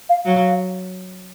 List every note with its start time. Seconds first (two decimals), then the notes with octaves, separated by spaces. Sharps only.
0.09 F5
0.25 F#3 F5